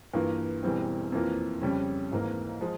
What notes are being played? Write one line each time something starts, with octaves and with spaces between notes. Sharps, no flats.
G2 E3 A#3 F4
E1 E2 E3 G3 C4
F2 E3 A#3 F4
F2 C#3 G3 C#4
G#1 G#2 E3 A#3
F3 G#3